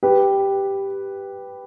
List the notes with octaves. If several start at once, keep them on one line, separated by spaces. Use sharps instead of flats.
G4 B4